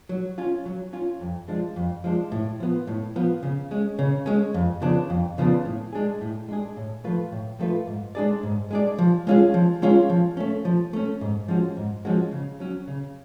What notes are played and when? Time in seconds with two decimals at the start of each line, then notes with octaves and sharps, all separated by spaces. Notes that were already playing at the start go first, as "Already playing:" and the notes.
0.09 F#3
0.38 C#4 F4
0.66 F#3
0.93 C#4 F4
1.21 F2
1.48 F3 G#3 D4
1.76 F2
2.04 F3 G#3 D4
2.32 A2
2.60 F3 B3
2.87 A2
3.16 F3 B3
3.43 C#3
3.71 G#3 C#4
3.99 C#3
4.26 G#3 C#4
4.54 F2
4.82 C#3 F3 B3 D4
5.10 F2
5.38 C#3 F3 B3 D4
5.65 A2
5.93 G#3 D4 G#4
6.21 A2
6.48 G#3 D4 G#4
6.77 A2
7.04 F3 A3 F4 B4
7.32 A2
7.59 F3 A3 F4 B4
7.87 G#2
8.15 G#3 D4 G#4 D5
8.43 G#2
8.71 G#3 D4 G#4 D5
8.99 F3
9.27 G#3 C#4 F4 G#4
9.54 F3
9.82 G#3 C#4 F4 G#4
10.10 F3
10.37 A3 C#4
10.65 F3
10.93 A3 C#4
11.21 G#2
11.48 F3 G#3 C#4 F#4
11.77 G#2
12.05 F3 G#3 C#4 F#4
12.32 C#3
12.60 F#3 C#4
12.88 C#3